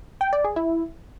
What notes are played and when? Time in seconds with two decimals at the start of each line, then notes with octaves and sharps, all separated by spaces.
0.21 G5
0.33 D5
0.44 G#4
0.56 E4